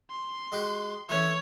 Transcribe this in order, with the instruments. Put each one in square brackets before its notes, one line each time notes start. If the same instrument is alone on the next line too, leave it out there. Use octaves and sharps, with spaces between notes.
[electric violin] C6
[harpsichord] G#3 F#4 G4
[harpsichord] E3 A3 C#4 [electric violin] C#5